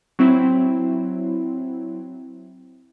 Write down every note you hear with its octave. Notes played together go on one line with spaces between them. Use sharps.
F#3 C4 E4